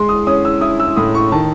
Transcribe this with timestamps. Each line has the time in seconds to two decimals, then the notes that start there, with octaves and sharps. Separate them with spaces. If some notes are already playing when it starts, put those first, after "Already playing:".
Already playing: G#3 C6
0.09 D#6
0.27 C#4 D#6
0.45 E6
0.61 E4 D#6
0.80 E6
0.96 A2 D#6
1.15 C#6
1.32 D#3 A5